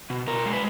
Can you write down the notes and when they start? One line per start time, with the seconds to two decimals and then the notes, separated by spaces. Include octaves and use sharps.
0.10 B2
0.27 B2 A#4
0.46 G#3
0.53 B4